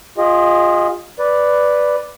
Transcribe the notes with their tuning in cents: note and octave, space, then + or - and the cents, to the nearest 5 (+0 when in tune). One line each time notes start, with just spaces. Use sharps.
F4 +10 G#4 -35 D#5 +0
B4 +0 D5 +0